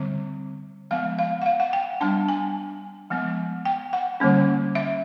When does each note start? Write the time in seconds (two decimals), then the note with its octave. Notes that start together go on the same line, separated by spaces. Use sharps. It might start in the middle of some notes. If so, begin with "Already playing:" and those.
Already playing: D3 G3 C4
0.91 F3 G#3 B3 F5
1.19 F5
1.42 F#5
1.46 F5
1.60 F#5
1.73 G5
2.01 G3 B3 D4 A5
2.29 G#5
3.10 F3 G#3 B3
3.65 G5
3.93 F#5
4.20 D3 G3 A#3 C#4
4.75 E5